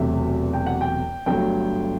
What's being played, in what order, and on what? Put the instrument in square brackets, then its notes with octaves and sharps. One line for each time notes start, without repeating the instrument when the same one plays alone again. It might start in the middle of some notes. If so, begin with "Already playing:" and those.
Already playing: [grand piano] E1 E2 C3 F#3 A3 E5
G5
F#5
G5
G1 G2 F#3 A3 G5